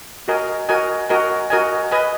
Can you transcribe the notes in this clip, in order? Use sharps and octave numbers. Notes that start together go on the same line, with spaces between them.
F#4 A#4 D#5 G#5
F#4 A#4 D#5 G#5
F#4 A#4 D#5 G#5
F#4 A#4 D#5 G#5
B4 D#5 G#5